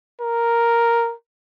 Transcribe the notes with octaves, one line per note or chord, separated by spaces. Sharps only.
A#4